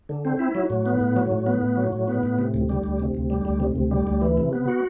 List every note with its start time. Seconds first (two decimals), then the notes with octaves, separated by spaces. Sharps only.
0.09 D3
0.25 C4
0.39 E4
0.55 F#3
0.70 A2
0.86 B3
1.00 A2
1.16 F#3
1.31 A2
1.46 B3
1.62 A2
1.77 F#3
1.92 A2
2.08 B3
2.23 A2
2.39 C3
2.54 D2
2.69 G3
2.84 D2
3.00 C3
3.15 D2
3.30 G3
3.45 D2
3.60 C3
3.76 D2
3.91 G3
4.07 D2
4.21 E3
4.38 C3
4.53 B3
4.68 F#4